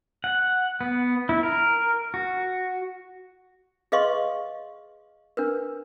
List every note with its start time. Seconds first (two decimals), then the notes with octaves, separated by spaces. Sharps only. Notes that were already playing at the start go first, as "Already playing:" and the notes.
0.24 F#5
0.81 B3
1.29 E4
1.43 A#4
2.14 F#4
3.92 G#4 B4 D#5 F5 C6 C#6
5.37 D4 A#4 B4